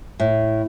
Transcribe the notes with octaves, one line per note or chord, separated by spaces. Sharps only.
A2